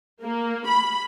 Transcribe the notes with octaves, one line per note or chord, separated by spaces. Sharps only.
A#3
B5